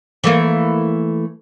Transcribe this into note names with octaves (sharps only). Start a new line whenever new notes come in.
E3 A3 A#3